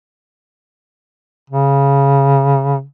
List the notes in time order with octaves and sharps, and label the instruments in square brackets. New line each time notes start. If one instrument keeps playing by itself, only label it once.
[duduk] C#3